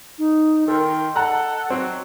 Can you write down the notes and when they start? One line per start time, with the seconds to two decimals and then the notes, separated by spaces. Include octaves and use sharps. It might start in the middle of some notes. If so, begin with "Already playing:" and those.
0.19 D#4
0.68 D#3 A4 A#4 D#5 G5 C6
1.16 A4 F#5 A5 A#5 F#6
1.70 F#3 C4